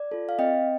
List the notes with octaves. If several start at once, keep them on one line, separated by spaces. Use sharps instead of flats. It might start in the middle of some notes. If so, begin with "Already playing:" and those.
Already playing: D5
F4 A4
F5
C4 D#5 G5